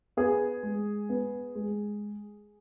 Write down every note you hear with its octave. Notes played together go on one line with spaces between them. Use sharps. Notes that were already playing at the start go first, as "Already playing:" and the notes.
B3 G#4
G#3
B3
G#3